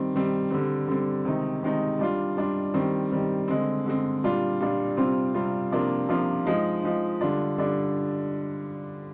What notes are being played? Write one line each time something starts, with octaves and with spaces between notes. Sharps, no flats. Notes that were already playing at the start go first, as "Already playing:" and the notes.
Already playing: D#3 G3 C4
D#3 G3 C4
D3 G3 C4
D3 G3 C4
C3 D#3 G#3 D#4
C3 D#3 G#3 D#4
G3 D4 F4
G3 D4 F4
D#3 G3 C4
D#3 G3 C4
D3 G#3 C4
D3 G#3 C4
A#2 G3 D4 F4
A#2 G3 D4 F4
C3 G3 C4 F4
C3 G3 C4 F4
C3 F3 A#3 D4 F4
C3 F3 A#3 D4 F4
F3 G#3 D#4
F3 G#3 D#4
D3 G3 D4 F4
D3 G3 D4